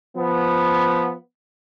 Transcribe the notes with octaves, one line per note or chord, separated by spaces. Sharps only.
F3 B3